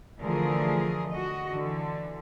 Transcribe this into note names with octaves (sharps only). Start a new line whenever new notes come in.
D3 E3 F3 A3 G#4 A#4
F#4 D#5
D3 E3